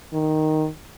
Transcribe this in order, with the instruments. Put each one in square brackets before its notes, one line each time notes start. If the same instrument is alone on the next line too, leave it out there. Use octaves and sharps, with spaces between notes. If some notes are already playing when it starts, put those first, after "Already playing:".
[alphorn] D#3